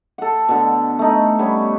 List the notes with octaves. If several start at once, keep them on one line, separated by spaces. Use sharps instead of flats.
A4 F#5
B2 D3
A3 D#4
G3 B3 C#4 C#5